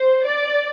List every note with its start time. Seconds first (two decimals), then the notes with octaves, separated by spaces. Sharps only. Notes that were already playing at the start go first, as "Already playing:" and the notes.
Already playing: C5
0.25 D5